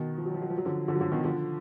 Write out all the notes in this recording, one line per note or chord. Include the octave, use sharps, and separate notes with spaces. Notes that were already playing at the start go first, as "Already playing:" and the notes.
Already playing: B2 D#3
F3
F#3
F3
F#3
F3
F#3
D3 F3
D3 F3
F#3
D3 F3
B2 D#3
D3 F3